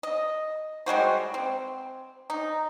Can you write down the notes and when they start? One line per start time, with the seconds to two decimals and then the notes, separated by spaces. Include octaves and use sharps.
0.03 D#5
0.86 G3 G#3 F#4 C5
1.34 C4
2.30 D#4